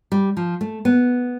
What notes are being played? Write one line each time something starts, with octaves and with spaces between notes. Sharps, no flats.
G3
F3
A3
B3